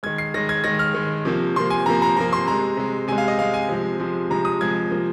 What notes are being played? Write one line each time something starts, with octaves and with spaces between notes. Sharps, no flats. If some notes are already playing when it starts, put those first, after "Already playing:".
D#3 G#3 G#6
C7
D#3 G#3 A#6
G#6
D#3 G#3 A#6
F6
D#3 G#3
C3 F3 A#3
C3 F3 A#3 C6
G#5
C3 F3 A#3 A#5
A#5
C3 F3 A#3 A#5
C6
C3 G#3 A#5
C3 G#3
C3 G#3 G#5
F5
D#5
C3 G#3 F5
G#5
C3 F3 G#3
C3 F3 G#3
C3 F3 G#3 A#5
D#6
C3 F3 G#3 G#6
C3 F3 A#3